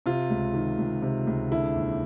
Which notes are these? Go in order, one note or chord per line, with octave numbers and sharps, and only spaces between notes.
C3 F4
C#2
D#3
C#2
C3
C#2
D3 E4
D#2